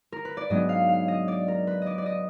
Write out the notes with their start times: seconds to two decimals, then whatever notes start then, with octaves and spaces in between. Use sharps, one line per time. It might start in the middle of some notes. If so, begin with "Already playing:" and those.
0.12 A#4
0.25 B4
0.37 D5
0.50 G#2 F#3 B3 D4 D#5
0.69 F5
0.89 F5
1.08 D#5
1.28 D5
1.48 A#4
1.67 B4
1.82 D5 D#5
1.98 D5
2.06 D#5